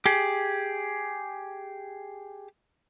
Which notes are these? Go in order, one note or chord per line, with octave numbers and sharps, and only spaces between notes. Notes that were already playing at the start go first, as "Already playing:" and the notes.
G4 G#4